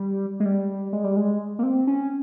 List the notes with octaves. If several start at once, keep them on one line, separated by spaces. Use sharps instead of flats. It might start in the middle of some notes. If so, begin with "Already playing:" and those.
Already playing: G3
G#3
G3
G#3
G3
G#3
A#3
C4
C#4